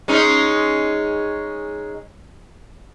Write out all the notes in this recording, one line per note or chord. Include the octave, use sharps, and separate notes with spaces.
G#3 C#4 D#4